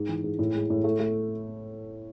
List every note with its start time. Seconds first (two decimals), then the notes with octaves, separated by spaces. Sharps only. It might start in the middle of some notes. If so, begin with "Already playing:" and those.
Already playing: G#2
0.09 E3
0.24 G#2
0.39 A2
0.55 G#3
0.70 A2
0.84 A3
0.99 A3